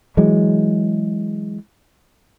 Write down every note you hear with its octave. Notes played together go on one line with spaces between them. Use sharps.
E3 F#3 G#3